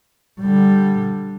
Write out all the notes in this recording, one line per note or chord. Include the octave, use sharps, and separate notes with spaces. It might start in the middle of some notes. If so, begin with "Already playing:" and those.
D3 G3